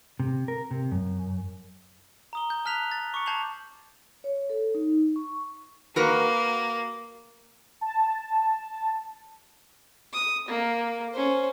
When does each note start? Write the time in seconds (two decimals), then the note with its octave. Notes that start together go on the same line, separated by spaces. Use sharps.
0.20 C3
0.48 A#4
0.71 C3
0.92 F#2
2.33 A#5 D#6 G7
2.50 G6
2.65 A5 F6 F#6 B6 F7
2.91 A6
3.14 C#6 D6 C#7
3.26 A5 G6 G#6 C7 F7 F#7
4.24 C#5
4.50 A4
4.75 D#4
5.16 C#6
5.96 A#3 F#4 A#4 B4
7.81 A5
10.13 D#6
10.48 A#3
11.13 C#4 C5